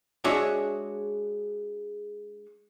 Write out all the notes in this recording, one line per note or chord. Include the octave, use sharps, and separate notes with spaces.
G#3 D4 F#4 G#4 C#5 E5